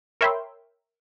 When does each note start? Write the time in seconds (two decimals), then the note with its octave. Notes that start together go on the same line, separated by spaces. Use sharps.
0.21 A#4 C#5 E5 G5 B5 C6